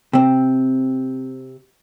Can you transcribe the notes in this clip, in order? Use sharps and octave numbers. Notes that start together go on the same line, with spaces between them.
C3 C4